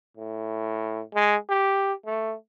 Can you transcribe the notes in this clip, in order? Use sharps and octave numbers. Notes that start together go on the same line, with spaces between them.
A2
G#3
G4
A3